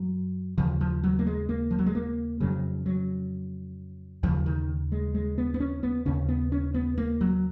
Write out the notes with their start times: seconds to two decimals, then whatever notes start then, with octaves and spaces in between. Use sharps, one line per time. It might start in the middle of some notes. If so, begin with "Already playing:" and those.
Already playing: F#2 F#3
0.58 D#2 C#3 F3
0.81 F3
1.03 F#3
1.19 A#3
1.27 G#3
1.49 A#3
1.70 F3
1.79 F#3
1.86 G#3
1.95 A#3
2.40 F2 C#3 F#3
2.86 F#3
4.23 D#2 C#3 F3
4.46 D#3
4.92 G#3
5.14 G#3
5.38 B3
5.54 B3
5.60 C#4
5.83 B3
6.05 D#2 C#3 C#4
6.29 B3
6.52 C#4
6.74 B3
6.98 A#3
7.21 F#3